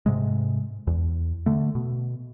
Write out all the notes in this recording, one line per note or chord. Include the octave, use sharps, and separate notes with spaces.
G#2 C3 G#3
E2
D3 A3
B2